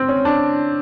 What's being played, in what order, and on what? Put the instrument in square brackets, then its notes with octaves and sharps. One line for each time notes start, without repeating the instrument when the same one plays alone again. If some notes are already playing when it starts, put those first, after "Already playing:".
Already playing: [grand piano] C4
C#4
D4